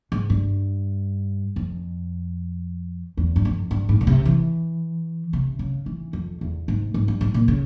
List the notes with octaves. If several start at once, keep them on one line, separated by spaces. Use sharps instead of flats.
G#2
G2
F2
E2
G2
F2
G2
G#2
A#2
C3
E3
C3
C#3
E3
F2
E2
G#2
G#2
G2
G#2
A#2
C#3